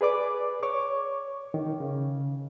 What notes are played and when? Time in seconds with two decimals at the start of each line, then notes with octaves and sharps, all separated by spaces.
0.01 G#4 B4 D5 D6
0.63 C#5 C#6 D6
1.54 D#3
1.80 C#3